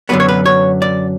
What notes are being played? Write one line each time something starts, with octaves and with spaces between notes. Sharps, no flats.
F#2 D3 F#3 B3 B4
C#5
B4
C#5
D5